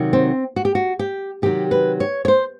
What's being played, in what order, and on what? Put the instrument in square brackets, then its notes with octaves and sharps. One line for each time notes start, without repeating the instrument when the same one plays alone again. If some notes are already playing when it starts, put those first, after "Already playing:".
Already playing: [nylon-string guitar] C3 D#3 F#3
C4
F#4
G4
F#4
G4
C3 D#3 F#3 G4
B4
C#5
C#5
C5